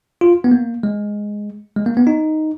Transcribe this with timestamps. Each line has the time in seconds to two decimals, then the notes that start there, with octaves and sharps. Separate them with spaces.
0.21 F4
0.44 B3
0.51 A#3
0.83 G#3
1.76 G#3
1.86 A#3
1.97 B3
2.07 D#4